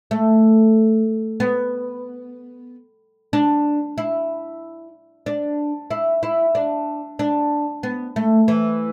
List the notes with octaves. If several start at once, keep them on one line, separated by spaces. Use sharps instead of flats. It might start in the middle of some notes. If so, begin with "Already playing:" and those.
A3
B3
D4
E4
D4
E4
E4
D4
D4
B3
A3
E3